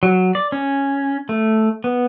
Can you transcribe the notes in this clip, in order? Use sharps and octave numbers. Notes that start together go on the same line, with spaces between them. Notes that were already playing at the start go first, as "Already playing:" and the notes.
F#3
D5
C#4
A3
B3